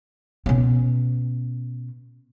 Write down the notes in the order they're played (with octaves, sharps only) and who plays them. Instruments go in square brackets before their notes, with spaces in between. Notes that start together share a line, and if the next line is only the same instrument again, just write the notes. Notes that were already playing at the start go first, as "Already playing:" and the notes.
[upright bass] B2 C#4